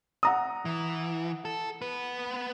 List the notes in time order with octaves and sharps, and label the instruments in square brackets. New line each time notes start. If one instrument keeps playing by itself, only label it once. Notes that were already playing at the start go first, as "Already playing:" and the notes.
[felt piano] F#5 A#5 D#6
[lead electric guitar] E3
A4
B3 B4